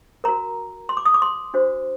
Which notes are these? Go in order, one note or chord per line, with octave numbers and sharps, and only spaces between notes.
F#4 A#4 A#5
C6
D6
D#6
D6
C6
D4 F#4 C5